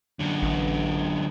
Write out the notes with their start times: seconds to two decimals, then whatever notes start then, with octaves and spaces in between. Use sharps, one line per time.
0.19 F#2 D3
0.42 A1